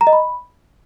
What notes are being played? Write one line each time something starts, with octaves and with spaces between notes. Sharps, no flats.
A#5
D#5
B5